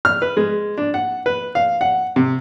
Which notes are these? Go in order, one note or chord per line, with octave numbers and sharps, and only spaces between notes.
F6
B4
G#3
D4
F#5
B4
F5
F#5
C3